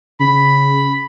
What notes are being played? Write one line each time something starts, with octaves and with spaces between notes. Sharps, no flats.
C#3 B5